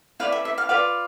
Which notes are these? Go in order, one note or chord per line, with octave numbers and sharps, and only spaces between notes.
E4 B4 D5 F5
E5
E5
F5
F4 B4 D5 F5